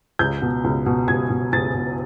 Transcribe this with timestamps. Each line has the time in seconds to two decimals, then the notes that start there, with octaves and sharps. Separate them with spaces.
0.19 C#2 G6
0.42 B2
0.64 C#2
0.86 B2
1.08 C#2 G#6
1.30 B2
1.52 C#2 A6
1.74 B2